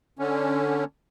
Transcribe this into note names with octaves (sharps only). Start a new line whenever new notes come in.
D3 C#4